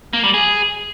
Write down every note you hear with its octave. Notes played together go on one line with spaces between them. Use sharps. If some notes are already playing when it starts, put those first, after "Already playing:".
A#3
G3
G#4